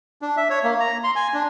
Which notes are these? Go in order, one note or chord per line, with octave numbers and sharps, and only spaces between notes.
D4
E5
C#5
A#3
A#5
C6
G#5
D4